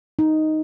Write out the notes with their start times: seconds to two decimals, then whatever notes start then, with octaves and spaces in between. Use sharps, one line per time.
0.19 D#4